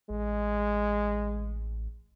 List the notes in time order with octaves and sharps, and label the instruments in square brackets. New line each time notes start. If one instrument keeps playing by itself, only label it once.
[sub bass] A1 [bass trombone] G#3